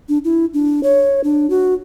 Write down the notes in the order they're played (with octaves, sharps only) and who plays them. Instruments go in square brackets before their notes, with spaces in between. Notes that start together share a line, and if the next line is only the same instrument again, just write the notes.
[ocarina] D4
E4
D4
C#5
D4
F#4